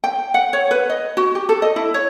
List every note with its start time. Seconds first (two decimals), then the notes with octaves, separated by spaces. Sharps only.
0.04 G5
0.34 F#5
0.53 C#5
0.71 B4
0.90 D#5
1.17 F#4
1.35 G4
1.49 A4
1.62 D#5
1.76 E4
1.94 C#5